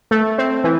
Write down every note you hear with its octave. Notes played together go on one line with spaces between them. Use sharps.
A3
C4
E3